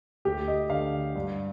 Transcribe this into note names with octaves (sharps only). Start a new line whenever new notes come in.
D2 G4
D#5
D3 F5
G2